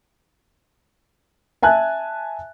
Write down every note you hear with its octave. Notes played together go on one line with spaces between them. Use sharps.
E5 G#5 A5 F#6